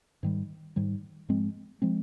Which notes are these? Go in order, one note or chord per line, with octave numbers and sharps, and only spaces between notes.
G#2 D#3 G3
G#2 D#3 G3
G#2 F3 G#3 C4
F3 G#3 C4